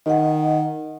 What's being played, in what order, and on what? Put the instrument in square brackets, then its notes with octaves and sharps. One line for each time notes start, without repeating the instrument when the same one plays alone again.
[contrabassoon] D#3 [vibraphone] D#5 F#5